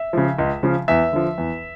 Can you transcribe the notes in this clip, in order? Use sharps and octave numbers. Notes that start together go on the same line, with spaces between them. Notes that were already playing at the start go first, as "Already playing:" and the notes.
Already playing: E5
C#3 F3
C#2
C#3 F3
E2 E5
D3 F3
E2